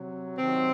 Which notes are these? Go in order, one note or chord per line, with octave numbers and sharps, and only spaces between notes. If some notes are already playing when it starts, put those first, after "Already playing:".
Already playing: C3 F#3
C3 D#3 F#3 C4